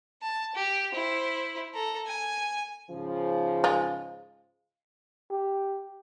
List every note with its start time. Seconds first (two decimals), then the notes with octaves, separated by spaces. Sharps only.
0.22 A5
0.55 G4
0.92 E4 C5
1.74 A4 A#5
2.06 G#5
2.90 G#2 C#3 F3
3.64 G#3 F4
5.31 G4